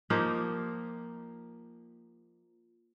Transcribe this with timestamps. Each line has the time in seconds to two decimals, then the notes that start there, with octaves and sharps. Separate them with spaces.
0.10 F3 A#3 D#4 G4